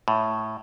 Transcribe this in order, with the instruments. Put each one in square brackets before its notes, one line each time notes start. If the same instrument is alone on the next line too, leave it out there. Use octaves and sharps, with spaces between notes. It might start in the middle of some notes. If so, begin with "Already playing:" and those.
[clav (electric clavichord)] A2